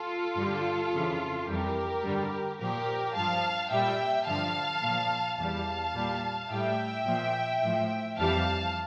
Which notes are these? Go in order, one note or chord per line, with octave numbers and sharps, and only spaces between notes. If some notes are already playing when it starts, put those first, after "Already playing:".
Already playing: F4 A4
G2 D3 G3
F2 C#3 E3
F2 E3 G3 G4 A#4
G2 D3 G3
A#2 F3 G4 A#4
G2 F3 F5 A5
A#2 G3 E5 G5
G2 D3 F3 F5 A5
A#2 F3
E2 E3 G3 F5 A5
A#2 G3
A2 G3 E5 G5
A#2 F3
A2 F3
F2 E3 G3 F5 A5